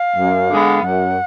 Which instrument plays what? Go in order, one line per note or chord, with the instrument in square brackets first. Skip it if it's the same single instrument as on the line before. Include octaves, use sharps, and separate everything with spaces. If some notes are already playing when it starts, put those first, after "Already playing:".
Already playing: [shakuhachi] F5
[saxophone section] F#2
D3 G#3 B3
[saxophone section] F#2 [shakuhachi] F#5